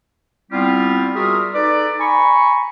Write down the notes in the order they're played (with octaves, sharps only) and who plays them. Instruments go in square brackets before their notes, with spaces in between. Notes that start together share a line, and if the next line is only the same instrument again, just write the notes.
[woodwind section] G3 B3 C4 E4 F4 G4
G3 F4 F#4 G#4 A#4 E5
D#4 A4 B4 D5
G#5 A#5 B5 C#6